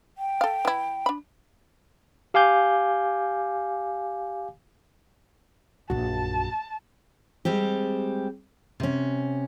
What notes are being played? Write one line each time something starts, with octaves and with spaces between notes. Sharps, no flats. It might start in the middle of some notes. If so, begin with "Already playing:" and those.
G5
A4 F5
E3 E4
D4 B5
G4 F5 G#5 D6 G6
A#1 F#2 F#4 A5
G3 G#3 C4 G4
C3 C#4